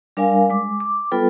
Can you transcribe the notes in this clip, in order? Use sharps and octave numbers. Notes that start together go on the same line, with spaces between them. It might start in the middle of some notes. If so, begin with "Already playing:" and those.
G3 D4 A#4 D5 F5 G#5
G#3 D6
D6
G3 B3 F4 A4 B4 G5